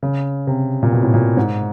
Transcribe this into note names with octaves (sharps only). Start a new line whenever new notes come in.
C#3
C3
A#2
B2
A2
A#2
G#2